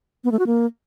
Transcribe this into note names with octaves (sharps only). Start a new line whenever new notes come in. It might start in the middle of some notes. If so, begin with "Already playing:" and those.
B3
A3
F#4
A#3